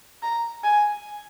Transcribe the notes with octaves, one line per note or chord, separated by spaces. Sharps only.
A#5
G#5